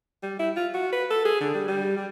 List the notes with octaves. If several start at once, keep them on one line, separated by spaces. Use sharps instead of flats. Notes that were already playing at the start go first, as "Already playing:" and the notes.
G3
E4
F4
F#4
B4
A4
G#4
D3
G3
G3
G3